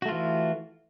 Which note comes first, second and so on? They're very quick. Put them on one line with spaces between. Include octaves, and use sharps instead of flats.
F#4 A3 F4 E3